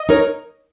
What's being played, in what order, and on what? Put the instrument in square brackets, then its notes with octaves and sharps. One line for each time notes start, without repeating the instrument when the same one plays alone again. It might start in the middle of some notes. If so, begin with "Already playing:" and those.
Already playing: [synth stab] D#5
[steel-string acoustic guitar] D#4 A#4 C#5